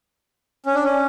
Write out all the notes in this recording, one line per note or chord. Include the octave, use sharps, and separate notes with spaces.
C#4
D4
C#4